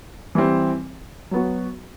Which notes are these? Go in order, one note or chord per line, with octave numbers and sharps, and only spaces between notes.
E3 G3 C4
F#3 B3 F#4